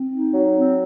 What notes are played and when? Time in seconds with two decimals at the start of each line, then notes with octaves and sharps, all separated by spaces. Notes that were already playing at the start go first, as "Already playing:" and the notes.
Already playing: C4
0.13 D#4
0.34 F#3
0.56 C4